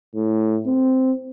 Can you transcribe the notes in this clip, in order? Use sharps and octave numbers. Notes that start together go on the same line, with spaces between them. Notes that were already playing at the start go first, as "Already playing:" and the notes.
A2
C4